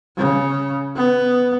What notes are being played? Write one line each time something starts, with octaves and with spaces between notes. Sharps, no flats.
C#3
B3